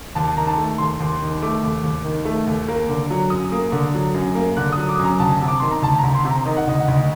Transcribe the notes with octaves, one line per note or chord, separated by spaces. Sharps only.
D#2 A5
D#3 A#5
A5
A3
D#2 C6
D#2
D#3
A3 D6
D#2
D#2
D#3
A3
D#2
A#3
D3
F#3
F#2 D#6
A#3
D3
F#3
F#2
A#3
D3 F#6
F#3 D#6
D6
F#2
A#5
D2 A5
C3
D6
D#3 C6
A#5
D2 A5
D2 A#5
C6
C3
A#5
D#3 D#5
F#5
D2 D#5
F#5
D2 D#5